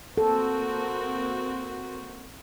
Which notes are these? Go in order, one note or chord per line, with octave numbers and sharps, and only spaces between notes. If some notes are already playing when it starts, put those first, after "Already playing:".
A#3 C4 F#4 A4